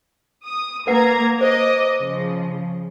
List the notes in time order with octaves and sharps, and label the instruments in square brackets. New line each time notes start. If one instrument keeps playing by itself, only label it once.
[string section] D#6
[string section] A#3 A#5 G#6 [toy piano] A#4 B4 F#5
[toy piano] C5 [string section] D#5 D6
[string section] C#3 F3